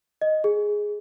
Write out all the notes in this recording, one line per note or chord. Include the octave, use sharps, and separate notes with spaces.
D#5
G#4